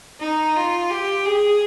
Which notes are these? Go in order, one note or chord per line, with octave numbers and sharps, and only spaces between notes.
D#4
F4
G4
G#4